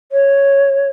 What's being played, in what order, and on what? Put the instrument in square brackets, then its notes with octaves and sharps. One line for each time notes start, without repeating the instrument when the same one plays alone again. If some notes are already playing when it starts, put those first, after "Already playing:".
[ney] C#5